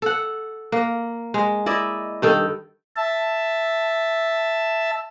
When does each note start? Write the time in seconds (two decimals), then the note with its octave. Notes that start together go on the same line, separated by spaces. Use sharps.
0.02 A4 F#5
0.72 A#3
1.34 G#3
1.66 E4 D5 D#5
2.22 G2 D#3 A4
2.96 E5 A5